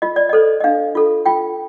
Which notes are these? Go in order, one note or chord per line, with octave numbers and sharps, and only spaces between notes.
F4 D#5
D5
A4 C5 D#5
D#5
D4 F5
F4 A4
F4 G5